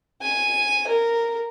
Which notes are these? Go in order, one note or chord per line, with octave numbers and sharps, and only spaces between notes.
G#5
A#4